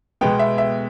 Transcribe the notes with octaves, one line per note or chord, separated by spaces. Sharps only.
B2 G#3 B3 G5
E5
E5